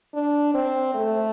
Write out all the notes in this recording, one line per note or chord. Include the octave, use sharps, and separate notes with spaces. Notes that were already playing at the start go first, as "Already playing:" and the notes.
D4
C4
A3